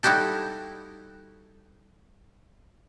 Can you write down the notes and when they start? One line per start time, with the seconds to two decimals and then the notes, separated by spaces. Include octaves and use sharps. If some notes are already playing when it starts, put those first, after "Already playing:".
0.03 G3 D#4 E4 F#4 G4 A4